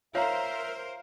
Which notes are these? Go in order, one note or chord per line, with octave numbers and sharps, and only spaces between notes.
F4 A#4 C5 C#5 E5 F5 A#5